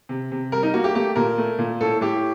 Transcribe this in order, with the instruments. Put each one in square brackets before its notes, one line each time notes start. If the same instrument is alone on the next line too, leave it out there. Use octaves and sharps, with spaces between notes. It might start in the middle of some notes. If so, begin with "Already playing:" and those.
[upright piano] C3
C3
G3 A#4
D#4
A#3 F#4
G4
A3 G4
A#2 A#4
A3
A#2
A2 A4
A2 G4